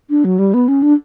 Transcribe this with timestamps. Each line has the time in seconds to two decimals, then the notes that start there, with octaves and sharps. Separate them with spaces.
0.10 D4
0.25 F#3
0.39 G3
0.54 B3
0.68 C#4
0.82 D4